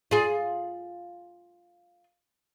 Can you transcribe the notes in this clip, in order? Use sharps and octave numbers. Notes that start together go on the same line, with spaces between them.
F4 G#4